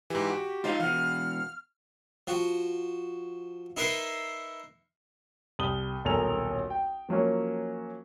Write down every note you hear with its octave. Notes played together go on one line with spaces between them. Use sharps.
G#2 E3 G4
F#4
C#2 D#4 F4 C5 F5
E2 B2 F5 F#5 F6
F3 F#4
D#4 E4 A#4 B4 C6
C2 D#6 G7
D#1 B1 A4 A#4 G#5 F7
G5
F3 F#3 A#3 C#4